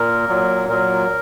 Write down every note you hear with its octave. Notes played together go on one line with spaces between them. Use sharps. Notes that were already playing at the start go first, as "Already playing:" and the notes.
Already playing: A#2 A#4
A#2 F#3
A#2 F#3 A#4